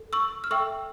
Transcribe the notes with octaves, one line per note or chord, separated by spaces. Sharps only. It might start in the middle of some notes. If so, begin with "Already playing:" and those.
Already playing: A4
C#6 E6
F6
A4 E5 G5 C#6 E6